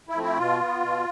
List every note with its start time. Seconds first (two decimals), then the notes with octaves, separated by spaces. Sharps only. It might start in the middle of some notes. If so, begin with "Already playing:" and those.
0.09 E4
0.16 F3 A3 C4
0.23 E4
0.38 B2 F4
0.60 B3
0.82 B2